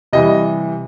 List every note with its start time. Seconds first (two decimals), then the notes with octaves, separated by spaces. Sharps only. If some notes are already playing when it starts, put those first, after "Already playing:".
0.13 C3 E3 G3 D#5